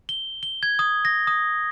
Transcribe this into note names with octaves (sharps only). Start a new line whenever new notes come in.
G7
G7
G#6
D#6
A#6
D#6